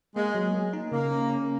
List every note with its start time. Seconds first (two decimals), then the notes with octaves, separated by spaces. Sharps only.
0.16 G#3 A#3
0.35 F#3
0.54 A#3
0.73 D#4
0.91 C#3 A#3
1.11 C#4
1.29 C#4